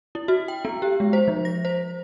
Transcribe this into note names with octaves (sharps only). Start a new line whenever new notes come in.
E4
F#4
G5
B3
G4
G#3
C5
F3
A#6
C5